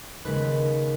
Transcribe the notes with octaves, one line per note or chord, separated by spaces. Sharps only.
D#2 C#3 G#3 B4